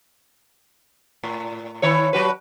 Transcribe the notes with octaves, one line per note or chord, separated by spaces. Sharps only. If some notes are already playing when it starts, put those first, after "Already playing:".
A2
D#3 E4 C#5
F#3 F#4 B4